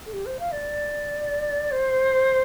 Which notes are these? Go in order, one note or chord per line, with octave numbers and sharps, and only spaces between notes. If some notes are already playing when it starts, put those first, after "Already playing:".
A4
G4
C5
F5
D5
C5